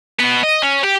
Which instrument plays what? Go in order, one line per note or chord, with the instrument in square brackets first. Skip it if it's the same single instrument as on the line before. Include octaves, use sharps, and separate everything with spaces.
[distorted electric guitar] B2 B3
D#5
C#4
G4